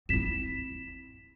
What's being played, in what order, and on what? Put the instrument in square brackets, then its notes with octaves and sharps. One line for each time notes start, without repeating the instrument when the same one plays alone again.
[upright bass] C4 E4 [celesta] B6 E7